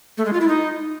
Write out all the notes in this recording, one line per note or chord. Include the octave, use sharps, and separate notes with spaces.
A3
G#3
F4
E4
D#4